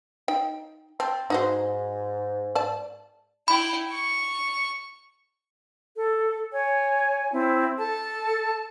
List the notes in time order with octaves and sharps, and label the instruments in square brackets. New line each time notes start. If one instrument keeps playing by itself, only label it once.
[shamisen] D#4 G5
[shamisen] C4 [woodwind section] A5
[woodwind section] G#2 [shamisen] D#4 F#4 C5
[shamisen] D5 A5
[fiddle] E4 G5 [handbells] B5
[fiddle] C#6
[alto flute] A4
[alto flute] C#5 [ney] G#5
[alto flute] C4 [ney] E4
[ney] A4 [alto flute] A5